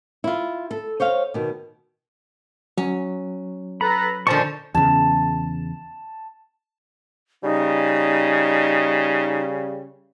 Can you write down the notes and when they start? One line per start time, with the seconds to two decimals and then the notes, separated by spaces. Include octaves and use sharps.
0.24 E4 F4
0.71 A4
1.00 C5 C#5 D#5 F5
1.34 B2 D#3
2.77 F#3 C#4
3.81 A4 B4 A#5 B5
4.27 A#2 D3 F3 C5 A5 C#6
4.75 E2 C#3 A5
7.43 C#3 G3 D#4